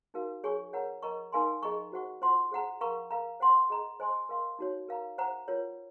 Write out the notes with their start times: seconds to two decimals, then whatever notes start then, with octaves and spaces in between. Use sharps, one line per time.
0.14 D#4 F#4 A#4 F5
0.44 G#4 C#5 G#5 C#6
0.73 A#4 C#5 F#5 A#5
1.03 A#4 D#5 A#5 C#6
1.32 D#4 A#4 F5 G#5 C6
1.63 G#4 D#5 A#5 C#6
1.92 F#4 C5 F#5 C#6
2.22 F4 C5 F#5 C6
2.52 G#4 C5 F#5 A#5
2.81 A#4 F5 A#5 C#6
3.11 A#4 F5 A#5
3.40 C5 F#5 C6
3.70 G#4 D#5 A#5
4.00 C5 D#5 G#5 C6
4.29 A#4 F5 C6
4.59 D#4 F#4 C#5
4.88 A#4 F5 A#5
5.18 C5 F#5 A#5
5.48 F4 A#4 C#5